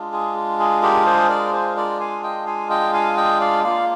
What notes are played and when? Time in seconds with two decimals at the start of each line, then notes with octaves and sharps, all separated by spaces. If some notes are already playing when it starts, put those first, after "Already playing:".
Already playing: G#3 D4 F4
0.12 G#4
0.60 G#4
0.83 G4 A#4
1.06 G#4 C5
1.29 A#4 D5
1.53 G#4 C5
1.77 A#4 D5
2.00 F5 G#5
2.23 D#5 G5
2.47 F5 G#5
2.70 D#5 G5
2.93 F5 G#5
3.17 D#5 G5
3.40 D5 F5
3.64 A#3 F4 D5 F5